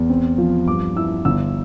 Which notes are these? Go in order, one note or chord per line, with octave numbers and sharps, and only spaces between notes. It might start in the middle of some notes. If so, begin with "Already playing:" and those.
Already playing: E2
C4
F3
G2 D6
E4 E6
G1 E6